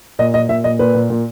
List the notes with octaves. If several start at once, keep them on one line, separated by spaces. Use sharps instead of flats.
A#2 D#5
A#2 D#5
A#2 E5
A#2 D#5
A#2 B4
A#2
A#2